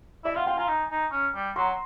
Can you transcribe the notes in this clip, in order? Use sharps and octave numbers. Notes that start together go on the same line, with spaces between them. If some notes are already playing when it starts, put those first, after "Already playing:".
E4 D5 E5
F4 E5 F#5
F4 F5 G5
F4 G#5 A#5
D#4
D#4
C#4
G3
F#3 A#5 C6